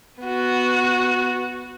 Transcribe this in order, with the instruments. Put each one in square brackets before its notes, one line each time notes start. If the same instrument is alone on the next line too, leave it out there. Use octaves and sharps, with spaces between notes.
[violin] B3 F#4